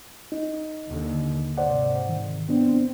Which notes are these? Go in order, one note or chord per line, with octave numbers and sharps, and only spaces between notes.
D#4
D#2 D3
G#2 C3 C5 D5 F#5
D#3
B3 C4 D4